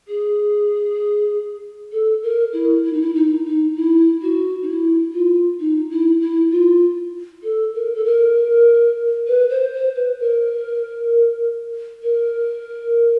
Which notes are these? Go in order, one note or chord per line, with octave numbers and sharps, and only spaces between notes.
G#4
A4
A#4
E4
E4
D#4
E4
D#4
D#4
E4
F#4
D#4
E4
F4
D#4
E4
E4
F4
A4
A#4
A4
A#4
B4
C5
C5
B4
A#4
A#4